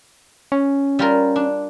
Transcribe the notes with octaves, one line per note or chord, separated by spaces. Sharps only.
C#4
G3 F4 A#4
D4